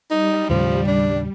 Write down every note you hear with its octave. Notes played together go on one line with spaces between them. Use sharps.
G3 D#4
D#2 A2 C#3 F3
D4